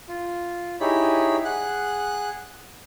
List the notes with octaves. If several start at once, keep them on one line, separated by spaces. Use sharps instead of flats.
F4
D#4 E4 G4 G#4 C#5 B5
G#4 F#5 F#6